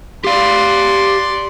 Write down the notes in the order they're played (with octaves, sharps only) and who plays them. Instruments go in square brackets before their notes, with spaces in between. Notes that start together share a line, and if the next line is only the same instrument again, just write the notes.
[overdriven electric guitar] G4 F5 [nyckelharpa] D5 C6